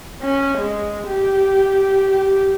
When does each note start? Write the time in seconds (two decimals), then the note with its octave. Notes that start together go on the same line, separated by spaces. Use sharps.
0.22 C#4
0.58 G#3
1.08 G4
2.12 G4